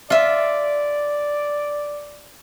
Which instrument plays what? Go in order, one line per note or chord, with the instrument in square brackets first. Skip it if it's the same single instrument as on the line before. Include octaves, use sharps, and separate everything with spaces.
[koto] F4 E5 [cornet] D5